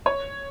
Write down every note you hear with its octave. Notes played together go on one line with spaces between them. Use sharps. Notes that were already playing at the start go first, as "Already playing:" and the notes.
C#5